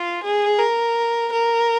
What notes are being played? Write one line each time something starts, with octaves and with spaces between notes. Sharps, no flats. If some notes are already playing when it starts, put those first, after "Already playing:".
Already playing: F4
G#4
A#4
A#4